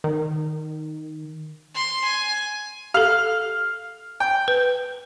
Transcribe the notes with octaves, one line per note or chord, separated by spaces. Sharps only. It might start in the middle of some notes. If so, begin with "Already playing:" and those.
D#3
C6
G#5
G4 A4 F5
G5
B4